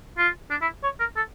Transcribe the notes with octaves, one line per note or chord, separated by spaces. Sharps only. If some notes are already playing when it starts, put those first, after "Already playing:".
F4
D4
E4
C#5
A#4
A4